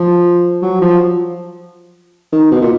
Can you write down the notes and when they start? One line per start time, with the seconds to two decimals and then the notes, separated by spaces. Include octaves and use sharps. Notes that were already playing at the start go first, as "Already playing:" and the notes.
Already playing: F3
0.62 F#3
0.81 F3
2.32 D#3
2.52 B2
2.61 A#2